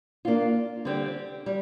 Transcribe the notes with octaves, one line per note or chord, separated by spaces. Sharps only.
A#3 D4 F4
D3 G3 C4 G4
G3